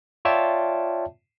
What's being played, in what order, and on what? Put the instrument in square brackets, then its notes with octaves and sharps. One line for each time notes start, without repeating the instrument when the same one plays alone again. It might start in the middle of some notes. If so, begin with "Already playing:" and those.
[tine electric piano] F4 C#5 D5 E5 G5 A5